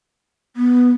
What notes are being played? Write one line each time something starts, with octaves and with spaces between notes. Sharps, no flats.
B3